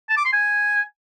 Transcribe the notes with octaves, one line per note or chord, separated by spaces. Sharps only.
A5
D6
C6
G#5